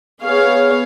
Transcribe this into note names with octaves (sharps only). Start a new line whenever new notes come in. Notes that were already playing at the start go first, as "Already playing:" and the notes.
B3 G#4 C#5 F5